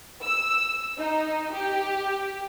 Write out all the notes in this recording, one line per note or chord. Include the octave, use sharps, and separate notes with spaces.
E6
D#4
G4